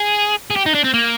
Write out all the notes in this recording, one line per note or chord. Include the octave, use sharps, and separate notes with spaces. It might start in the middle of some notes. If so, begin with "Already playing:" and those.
Already playing: G#4
G#4
G4
D#4
D4
C4
A#3